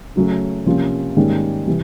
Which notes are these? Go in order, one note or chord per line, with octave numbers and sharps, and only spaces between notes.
C#3 F#3 A3 C#4
C3 F3 A#3 C#4 F4
G#2 D#3 G3 A#3 C#4
C3 E3